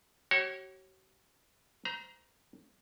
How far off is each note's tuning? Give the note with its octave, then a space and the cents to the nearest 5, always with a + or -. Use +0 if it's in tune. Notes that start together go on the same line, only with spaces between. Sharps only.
F#4 +45 C#5 -20
C5 -25 A#5 +20